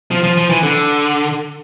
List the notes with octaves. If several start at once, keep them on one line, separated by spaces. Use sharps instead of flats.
F3
F3
F3
E3
D3